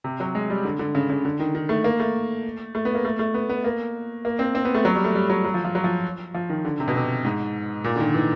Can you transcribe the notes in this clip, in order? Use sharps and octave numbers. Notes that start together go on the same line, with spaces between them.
C3
F#3
G#3
G3
D3
D3
C#3
C#3
D3
D#3
D#3
A3
A#3
A3
A3
B3
A#3
A3
A3
B3
B3
A#3
A#3
C4
C4
B3
A3
F#3
G3
A3
G3
F#3
F#3
F3
F3
F#3
F3
F3
D#3
D3
C3
B2
C3
G#2
A#2
D3
D#3
E3